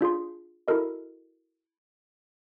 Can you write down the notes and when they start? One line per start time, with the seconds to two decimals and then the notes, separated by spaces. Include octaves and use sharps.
0.01 D4 F4 G#4 C6
0.68 E4 F#4 A4 A#4 D#5